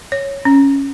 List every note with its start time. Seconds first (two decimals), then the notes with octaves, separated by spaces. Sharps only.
0.12 C#5
0.45 C#4